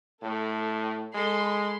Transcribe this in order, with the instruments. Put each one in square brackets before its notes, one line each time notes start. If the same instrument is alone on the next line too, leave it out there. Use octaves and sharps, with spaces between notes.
[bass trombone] A2 [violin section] A4
[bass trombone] G#3 [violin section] A4 B5 C6